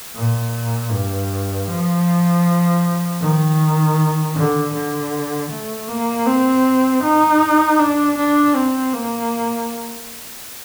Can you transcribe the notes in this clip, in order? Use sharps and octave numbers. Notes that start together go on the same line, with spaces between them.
A#2
G2
F3
D#3
D3
D3
A3
A#3
C4
D#4
D4
D4
C4
A#3